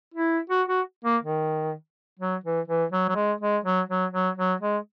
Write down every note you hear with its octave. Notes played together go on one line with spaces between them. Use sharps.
E4
F#4
F#4
A#3
D#3
F#3
E3
E3
F#3
F#3
G#3
G#3
F#3
F#3
F#3
F#3
G#3